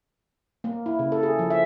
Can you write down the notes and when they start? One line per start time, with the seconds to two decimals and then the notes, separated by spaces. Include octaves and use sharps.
0.64 A#3
0.86 E4
0.99 C#3
1.12 A4
1.23 G#4
1.39 F3
1.50 E5